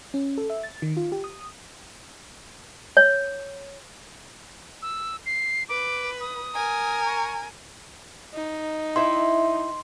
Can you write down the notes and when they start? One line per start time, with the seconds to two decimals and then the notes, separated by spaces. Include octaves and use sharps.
0.14 C#4
0.38 A4
0.50 E5
0.63 A6
0.82 D#3
0.97 F4
1.12 G4
1.24 D#6
2.97 C#5
4.82 E6
5.26 C7
5.69 B4 D6
6.20 D#6
6.54 A#4 G#5
7.06 C#6
8.34 D#4
8.96 E4 E5 G5 C6